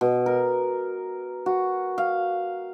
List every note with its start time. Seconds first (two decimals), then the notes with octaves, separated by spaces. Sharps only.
0.01 B2
0.26 A#4
1.46 F#4
1.98 F5